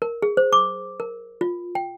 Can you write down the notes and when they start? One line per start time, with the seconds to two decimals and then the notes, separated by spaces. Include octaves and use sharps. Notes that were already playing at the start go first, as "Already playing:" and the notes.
0.02 A#4
0.22 G#4
0.37 C5
0.53 D6
1.00 A#4
1.41 F4
1.75 G5